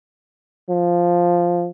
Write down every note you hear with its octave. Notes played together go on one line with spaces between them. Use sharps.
F3